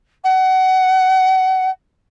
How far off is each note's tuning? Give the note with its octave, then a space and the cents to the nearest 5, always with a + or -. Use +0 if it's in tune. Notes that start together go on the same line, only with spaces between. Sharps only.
F#5 +25